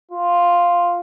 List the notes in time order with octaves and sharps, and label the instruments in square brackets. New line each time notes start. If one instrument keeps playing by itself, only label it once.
[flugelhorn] F4